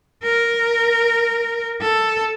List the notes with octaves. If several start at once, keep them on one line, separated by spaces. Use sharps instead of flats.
A#4
A4